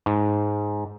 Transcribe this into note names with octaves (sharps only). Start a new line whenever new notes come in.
G#2